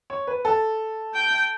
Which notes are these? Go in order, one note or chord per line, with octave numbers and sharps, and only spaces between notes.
C#5
B4
A4
G5